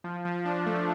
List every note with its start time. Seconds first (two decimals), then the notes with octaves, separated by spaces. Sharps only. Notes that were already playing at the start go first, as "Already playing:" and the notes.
0.04 F3
0.25 F3
0.45 D4
0.66 A3